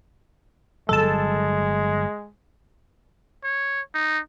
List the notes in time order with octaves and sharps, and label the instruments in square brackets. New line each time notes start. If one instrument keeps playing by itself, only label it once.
[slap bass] G1 C#2 F#3 [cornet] G#3 [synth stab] A4 A5
[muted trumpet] C#5
D#4